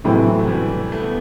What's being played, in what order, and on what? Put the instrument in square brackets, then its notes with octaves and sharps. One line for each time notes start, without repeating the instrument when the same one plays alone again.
[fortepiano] A2 F#3 C4 [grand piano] C3 E3
[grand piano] A3
E3 G3
A3
B3